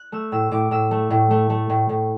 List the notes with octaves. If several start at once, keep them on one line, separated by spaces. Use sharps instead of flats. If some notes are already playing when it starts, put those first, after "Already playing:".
Already playing: F#6
A3 E6
A2 E6
A2 D6
A2 E6
A3
A2
A3
A3
A2
A2